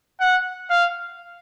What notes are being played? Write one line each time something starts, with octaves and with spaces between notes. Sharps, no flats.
F#5
F5